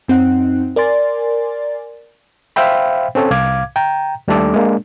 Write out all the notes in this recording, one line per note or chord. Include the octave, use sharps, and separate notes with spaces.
F#2 C4 D#4 F#5 F#6
A#4 D5 G#5 C6 A6
C5 E5 F5 G5 B5
C4 C#4 A4 C#5
C2 F5 D6 G#6
G5 A#5
D#2 G3 A3 D4 A4 D6
G#3 A#3 D4